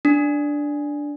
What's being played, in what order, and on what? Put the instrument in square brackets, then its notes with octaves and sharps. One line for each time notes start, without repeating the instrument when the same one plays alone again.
[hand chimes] D4